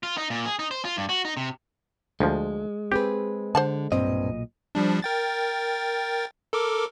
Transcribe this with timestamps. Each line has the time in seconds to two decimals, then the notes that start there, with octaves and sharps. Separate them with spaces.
0.03 F4
0.18 D#4
0.30 A#2
0.45 G#4
0.59 D#4
0.71 C5
0.85 F4
0.97 G2
1.09 F#4
1.25 D#4
1.37 C3
2.20 D2 F3 G#3
2.92 C4 G4 G#4 B4
3.55 D3 C5 F#5 A5
3.92 B1 G2 A#2 C4 D#5
4.75 F3 G3 D4
5.02 A#4 G5 A6
6.53 A4 A#4 D6